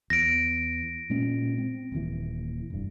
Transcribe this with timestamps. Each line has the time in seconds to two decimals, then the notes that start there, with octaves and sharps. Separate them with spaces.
0.10 E2 A#6 D7
1.10 A#2 G#3 C#4
1.58 C4
1.92 D#1 D#2 E3
2.70 F1 G2